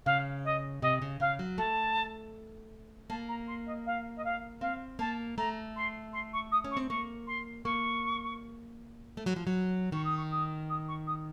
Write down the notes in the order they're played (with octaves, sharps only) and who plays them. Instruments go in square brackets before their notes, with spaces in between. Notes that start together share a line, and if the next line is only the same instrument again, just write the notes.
[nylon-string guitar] C#3 [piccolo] F5
[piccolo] D#5
[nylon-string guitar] C3 [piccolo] D#5
[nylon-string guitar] C#3
[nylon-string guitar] C#3 [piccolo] F5
[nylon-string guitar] F#3
[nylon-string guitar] A3 [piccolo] A5
[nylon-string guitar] A#3 [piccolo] A5
[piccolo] A#5
C6
D#5
F5
D#5
F5
[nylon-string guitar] C4 [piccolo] F5
[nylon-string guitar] A#3 [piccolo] A5
[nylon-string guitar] A3 [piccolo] A#5
[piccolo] C6
C6
C#6
D#6
[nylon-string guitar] C#4
[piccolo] C#6
[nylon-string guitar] C4
[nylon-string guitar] A#3 [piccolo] C#6
[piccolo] C6
[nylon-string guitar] A#3 [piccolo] C#6
[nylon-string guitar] A3
F#3
F3
F#3
[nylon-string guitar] D#3 [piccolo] C#6
[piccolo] D#6
C#6
D#6
D#6
C#6
D#6